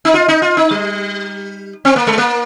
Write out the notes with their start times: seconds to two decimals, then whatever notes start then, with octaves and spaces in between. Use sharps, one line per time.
0.05 D#4
0.14 F4
0.28 D#4
0.42 F4
0.57 D#4
0.71 G3
1.85 C4
1.96 A#3
2.07 G#3
2.18 A#3